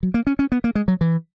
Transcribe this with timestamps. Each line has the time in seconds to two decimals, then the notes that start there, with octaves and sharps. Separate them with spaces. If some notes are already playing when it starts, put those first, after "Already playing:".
0.03 F#3
0.14 A#3
0.27 C#4
0.39 C#4
0.52 B3
0.64 A#3
0.75 G#3
0.88 F#3
1.01 E3